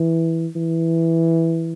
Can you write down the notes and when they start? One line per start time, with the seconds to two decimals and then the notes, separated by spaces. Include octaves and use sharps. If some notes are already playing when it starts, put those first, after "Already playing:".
Already playing: E3
0.56 E3